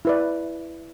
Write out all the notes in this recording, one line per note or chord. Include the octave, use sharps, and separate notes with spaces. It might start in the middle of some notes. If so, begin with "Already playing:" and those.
E4 B4 D5